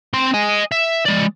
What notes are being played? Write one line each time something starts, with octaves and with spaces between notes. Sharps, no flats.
C4 C6
D#5 G#5
E5
G#3 D5